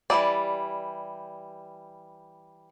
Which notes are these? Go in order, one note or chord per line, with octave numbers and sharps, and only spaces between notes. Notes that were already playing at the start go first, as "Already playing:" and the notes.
E3 G3 D#4 D5